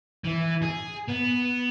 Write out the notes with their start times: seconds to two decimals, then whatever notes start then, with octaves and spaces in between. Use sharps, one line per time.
0.25 E3
0.63 G#4
1.09 B3